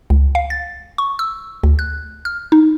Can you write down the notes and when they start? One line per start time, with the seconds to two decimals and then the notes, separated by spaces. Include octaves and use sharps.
0.10 C#2
0.35 F5
0.50 A6
0.98 C#6
1.19 E6
1.64 D2
1.79 F#6
2.25 F6
2.52 D#4